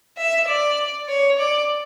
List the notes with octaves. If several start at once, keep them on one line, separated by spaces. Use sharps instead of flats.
E5
D5
C#5
D5